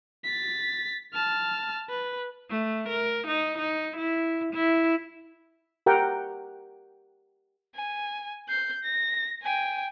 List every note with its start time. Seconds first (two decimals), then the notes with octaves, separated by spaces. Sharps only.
0.25 A6 B6
1.13 A5 F6
1.90 B4
2.49 A3
2.89 A#4
3.27 D#4
3.59 D#4
3.97 E4
4.53 E4
5.86 G4 A#4 F#5 G5
7.75 G#5
8.49 G6 C7
8.84 A#6
9.43 G5 G#5